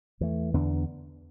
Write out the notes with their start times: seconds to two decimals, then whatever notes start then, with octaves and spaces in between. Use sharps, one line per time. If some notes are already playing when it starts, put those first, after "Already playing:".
0.20 E2 E3 A3
0.54 E2 D3 B3 D4